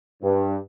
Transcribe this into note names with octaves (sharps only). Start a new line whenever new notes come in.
G2